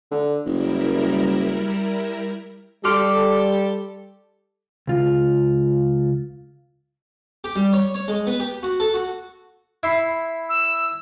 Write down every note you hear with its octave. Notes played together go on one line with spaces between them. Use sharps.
D3
F#1 G3 E4 A#4
G3 G4 A4 C6 D6 F6
C#2 F4
G4
G3
C#5
C#5
G#3
B3
G4
F#4
A4
F#4
E4 C6
E6